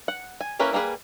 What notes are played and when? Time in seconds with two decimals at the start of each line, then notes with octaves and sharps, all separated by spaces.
0.08 F#5
0.41 G#5
0.59 A#3 C#4 E4 A#4 B4
0.73 G3 A#3 B3 G#4 B4